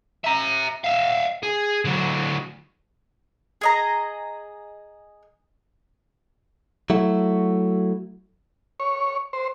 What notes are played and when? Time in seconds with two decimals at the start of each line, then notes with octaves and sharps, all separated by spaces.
0.24 E5 A#5
0.84 E5 F5
1.43 G#4
1.85 D3 F#3
3.61 G#4 D#5 A#5
6.90 F#3 A3 E4 F#4
8.80 C#5
9.33 C5